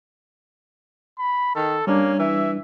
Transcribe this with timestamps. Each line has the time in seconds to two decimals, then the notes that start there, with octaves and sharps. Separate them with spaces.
1.19 B5
1.55 D#3 A4
1.87 G3 A#3 C#4 D4
2.19 E3 E5